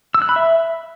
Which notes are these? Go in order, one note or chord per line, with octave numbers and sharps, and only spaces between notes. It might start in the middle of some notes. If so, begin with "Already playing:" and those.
E6
F#6
B5
E5